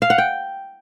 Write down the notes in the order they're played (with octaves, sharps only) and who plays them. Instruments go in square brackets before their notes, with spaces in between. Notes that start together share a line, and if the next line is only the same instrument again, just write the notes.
[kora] F5
F#5
G5